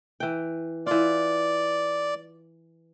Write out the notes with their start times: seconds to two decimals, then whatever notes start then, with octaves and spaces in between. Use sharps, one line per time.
0.20 E3 G5
0.87 E3 F4 D5